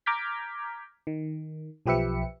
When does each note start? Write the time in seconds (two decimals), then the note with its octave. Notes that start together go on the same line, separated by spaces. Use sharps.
0.06 A#5 D6 F6 G6 G#6 B6
1.07 D#3
1.86 B1 F3 G4 B4 E5 C#7